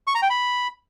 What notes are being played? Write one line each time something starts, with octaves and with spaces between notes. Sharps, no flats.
C#6
A#5
G5
B5